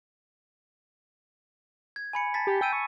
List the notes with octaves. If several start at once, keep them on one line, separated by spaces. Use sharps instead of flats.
G#6
G#5 B5 C#7
A5 A6 B6
G4
G5 G#5 E6 D#7
C#6